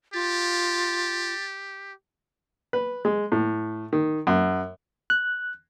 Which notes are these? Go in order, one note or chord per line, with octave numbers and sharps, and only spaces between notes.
F4 G4 A6
B4
G#3
A2
D#3
F#2
F#6